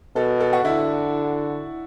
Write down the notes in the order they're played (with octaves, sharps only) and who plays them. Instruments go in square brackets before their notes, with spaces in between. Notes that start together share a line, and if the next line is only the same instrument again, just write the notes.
[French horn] B2 [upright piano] A4
[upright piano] A4
F#4
[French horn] D3 [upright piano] E4